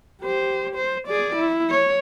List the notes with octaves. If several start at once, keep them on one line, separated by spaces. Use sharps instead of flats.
G4 C5
C5
G#4 D5
E4
C#5